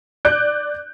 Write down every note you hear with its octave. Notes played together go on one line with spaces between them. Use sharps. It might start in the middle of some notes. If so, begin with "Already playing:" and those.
D5 F#6 G6 D7